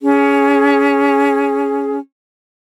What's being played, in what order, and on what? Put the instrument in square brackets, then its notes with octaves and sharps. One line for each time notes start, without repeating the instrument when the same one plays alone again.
[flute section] C#4 G#4